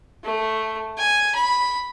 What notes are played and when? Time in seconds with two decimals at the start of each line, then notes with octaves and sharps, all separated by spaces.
0.24 A3
0.98 G#5
1.35 B5